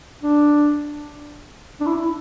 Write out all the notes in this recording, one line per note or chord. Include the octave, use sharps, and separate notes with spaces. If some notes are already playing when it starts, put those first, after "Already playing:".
D4
D4
E4